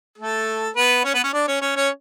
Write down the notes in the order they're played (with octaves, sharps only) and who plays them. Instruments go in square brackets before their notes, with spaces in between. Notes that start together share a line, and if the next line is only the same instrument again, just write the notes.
[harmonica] A3 A4
B3 B4
C#4 C#5
B3 B4
C#4 C#5
D4 D5
C#4 C#5
C#4 C#5
C#4 C#5